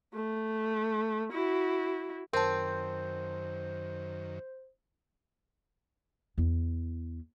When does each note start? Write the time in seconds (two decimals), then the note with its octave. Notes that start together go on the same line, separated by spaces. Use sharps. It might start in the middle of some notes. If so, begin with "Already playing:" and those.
0.14 A3
1.32 E4 F#4
2.33 F#2 D#3 C4 A#4 C5 A5
6.38 E2 E4